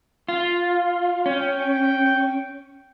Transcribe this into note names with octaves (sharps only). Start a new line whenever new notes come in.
F4
C#4 G5